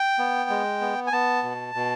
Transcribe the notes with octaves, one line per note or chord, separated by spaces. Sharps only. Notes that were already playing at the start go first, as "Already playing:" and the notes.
Already playing: G5
B3
G#3
B3
G#5
B3 A5
B2
B2